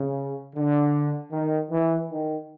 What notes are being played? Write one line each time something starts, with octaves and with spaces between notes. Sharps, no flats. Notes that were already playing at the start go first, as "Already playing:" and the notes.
Already playing: C#3
D3
D#3
E3
D#3